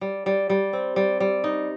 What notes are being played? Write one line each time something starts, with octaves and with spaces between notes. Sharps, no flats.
G3
G3
G3
C4
G3
G3
D#4